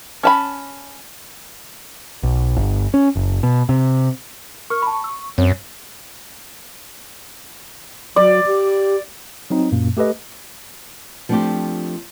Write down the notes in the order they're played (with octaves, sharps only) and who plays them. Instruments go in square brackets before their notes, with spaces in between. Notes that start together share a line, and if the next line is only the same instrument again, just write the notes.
[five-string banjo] C#4 A5 B5
[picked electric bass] B1
G1
C#4
F#1
B2
C3
[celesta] A#4 F6 [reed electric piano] C#6
[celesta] A5 B5
E6
[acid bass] F#2 [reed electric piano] C4 [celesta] C#5
[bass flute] F#3 [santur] D5
[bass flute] G4
[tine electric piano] F#3 C4 D#4
F#2 A#2 A#3
A3 G4 A4 B4 D#5
[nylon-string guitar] F3 A3 C4 D4 F4 G4